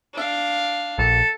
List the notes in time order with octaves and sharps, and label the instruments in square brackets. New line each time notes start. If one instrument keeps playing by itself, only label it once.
[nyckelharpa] D4 F5
[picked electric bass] A#1 [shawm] A4